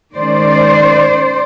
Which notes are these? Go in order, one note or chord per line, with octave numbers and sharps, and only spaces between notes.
D#3 G#3 C#4 C5 D5